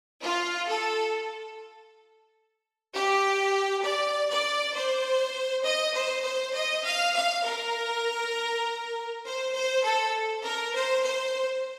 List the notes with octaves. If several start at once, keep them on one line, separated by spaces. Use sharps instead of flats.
F4
A4
G4
D5
D5
C5
D#5
C5
C5
D#5
F5
F5
A#4
C5
C5
A4
A#4
C5
C5